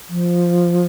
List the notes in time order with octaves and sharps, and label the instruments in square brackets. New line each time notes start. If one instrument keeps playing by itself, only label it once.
[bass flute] F3